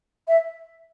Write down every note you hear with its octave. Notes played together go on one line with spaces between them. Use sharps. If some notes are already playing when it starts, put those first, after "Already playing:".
E5